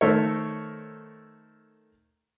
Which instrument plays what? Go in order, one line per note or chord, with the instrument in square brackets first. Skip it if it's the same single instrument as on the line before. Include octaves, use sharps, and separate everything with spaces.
[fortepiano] D#3 A3 A4 A#4 C5 C#5